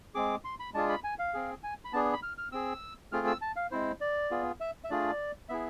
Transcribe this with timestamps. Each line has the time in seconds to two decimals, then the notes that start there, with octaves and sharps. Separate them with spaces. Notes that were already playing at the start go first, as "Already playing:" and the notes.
0.15 G#3 C4 G#4 D6
0.45 C6
0.60 B5
0.74 G#3 D4 F4 G#4 A5
0.89 B5
1.04 G#5
1.19 F5
1.34 C4 G#4
1.63 G#5
1.85 B5
1.93 B3 D4 G#4 A5
2.13 B5
2.23 F6
2.38 F6
2.52 C4 G#4 E6
3.12 A3 C4 F4 G#4 F6
3.27 E6
3.41 A5
3.56 F5
3.71 G#3 C4 E4 C5
4.01 D5
4.31 B3 F4 G#4
4.61 E5
4.84 E5
4.90 A3 D4 F4 G#4 D5
5.49 B3 E4 G#4 E5